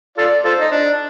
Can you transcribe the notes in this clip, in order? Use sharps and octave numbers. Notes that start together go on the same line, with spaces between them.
F4 A4 D5
F4 A4 C5
D#4
D4